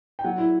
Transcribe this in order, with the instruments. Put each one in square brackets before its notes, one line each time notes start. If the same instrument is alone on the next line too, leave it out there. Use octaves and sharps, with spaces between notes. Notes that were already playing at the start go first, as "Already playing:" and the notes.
[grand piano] G5
[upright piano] F#3 [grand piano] F#5
[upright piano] E4